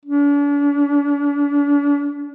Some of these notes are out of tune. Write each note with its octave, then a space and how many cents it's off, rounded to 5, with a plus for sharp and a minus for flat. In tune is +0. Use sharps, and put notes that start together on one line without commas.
D4 -40